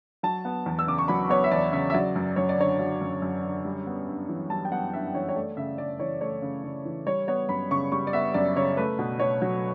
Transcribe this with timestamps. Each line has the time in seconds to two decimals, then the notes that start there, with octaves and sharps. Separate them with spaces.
0.23 F#3 A5
0.45 B3
0.66 E2
0.79 E6
0.87 C#3 D6
0.98 C#6
1.08 F#3 B5
1.30 B3 C#5
1.44 E5
1.51 E2 D5
1.73 C#3 E5
1.90 E5
1.94 F#3 D5
2.16 F#2
2.36 F#2 C#5
2.49 D5
2.58 D3 C#5
2.79 F#3
3.01 F#2
3.22 F#2
3.44 D3
3.65 G3
3.87 B3
4.07 G2
4.29 E3
4.50 G3 A5
4.65 G5
4.72 B3 F#5
4.92 G2 E5
5.14 E3 C#5
5.29 C#5
5.35 A3 D5
5.57 C#3 E5
5.78 C#3 D5
6.00 E3 C#5
6.21 A3 C#5
6.42 C#3
6.64 C#3
6.85 E3
7.07 G3 C#5
7.28 B3 C#5
7.49 F#2 B5
7.71 C#3 C#6
7.92 G3 C#6
8.07 D5
8.13 B3 E5
8.34 F#2 D5
8.56 C#3 C#5
8.77 A3 B4
8.99 B2
9.19 B2 C#5
9.42 F#3